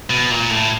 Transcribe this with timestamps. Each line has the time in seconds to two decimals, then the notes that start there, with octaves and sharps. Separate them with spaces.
0.10 B2
0.30 A#2
0.50 A2